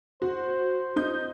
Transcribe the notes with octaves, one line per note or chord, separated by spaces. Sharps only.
F#4 C5
D#4 G6